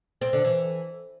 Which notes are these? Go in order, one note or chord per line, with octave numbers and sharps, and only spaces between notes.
C4
D3
E3